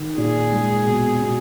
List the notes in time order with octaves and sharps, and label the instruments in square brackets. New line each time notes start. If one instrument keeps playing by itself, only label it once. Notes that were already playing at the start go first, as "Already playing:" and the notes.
Already playing: [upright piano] D#3
[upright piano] A#2 [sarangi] G#4
[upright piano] G#3
B2
B2